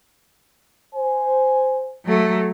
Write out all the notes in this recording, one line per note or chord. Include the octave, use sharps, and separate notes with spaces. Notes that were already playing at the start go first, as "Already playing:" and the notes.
C5 G#5
F#3 A3